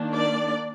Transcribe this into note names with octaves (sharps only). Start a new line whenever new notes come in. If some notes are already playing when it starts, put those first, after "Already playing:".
Already playing: D#3 A#3 D4
D5